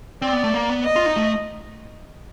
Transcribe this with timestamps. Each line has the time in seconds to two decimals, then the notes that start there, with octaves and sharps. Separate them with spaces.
0.22 C4 D5
0.33 B3
0.44 A3
0.54 A#3
0.69 B3
0.85 D#5
0.96 F4
1.06 D#4
1.16 A3